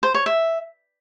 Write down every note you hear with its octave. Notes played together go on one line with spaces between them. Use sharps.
C5
C#5
E5